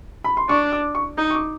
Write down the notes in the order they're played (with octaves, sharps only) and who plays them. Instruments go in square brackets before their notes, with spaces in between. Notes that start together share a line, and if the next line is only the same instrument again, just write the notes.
[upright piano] B5
C6
[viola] D4 [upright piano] C#6
[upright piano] D6
C#6
[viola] D#4
[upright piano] C#6
D6